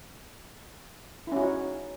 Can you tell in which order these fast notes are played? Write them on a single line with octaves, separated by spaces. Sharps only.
E4 C#4 F#4 D#4